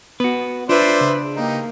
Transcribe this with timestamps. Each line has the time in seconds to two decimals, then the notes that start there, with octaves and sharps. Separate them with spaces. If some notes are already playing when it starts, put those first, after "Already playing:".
0.20 B3 F#4 B4
0.69 D4 F4 B4 C5 D5 E5
1.01 C#3
1.36 A#3 D#4 G4